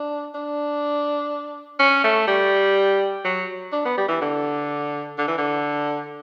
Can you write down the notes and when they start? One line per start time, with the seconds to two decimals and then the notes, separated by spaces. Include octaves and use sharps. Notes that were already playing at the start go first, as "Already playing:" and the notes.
Already playing: D4
0.35 D4
1.80 C#4
2.04 A3
2.28 G3
3.25 F#3
3.72 D4
3.85 B3
3.97 G3
4.08 E3
4.22 D3
5.18 D3
5.28 E3
5.38 D3